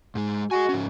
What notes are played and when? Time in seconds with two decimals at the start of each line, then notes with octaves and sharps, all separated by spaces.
0.15 G#2 G#3
0.51 F#4 G#4 D#5 G#5
0.69 G#2 C#4